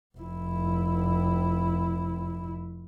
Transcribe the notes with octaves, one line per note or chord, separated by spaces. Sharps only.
F1 E4